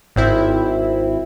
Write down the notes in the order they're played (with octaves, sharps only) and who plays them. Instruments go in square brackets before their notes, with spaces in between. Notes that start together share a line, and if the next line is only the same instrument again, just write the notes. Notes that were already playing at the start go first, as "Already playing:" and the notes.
[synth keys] G#1 C4 E4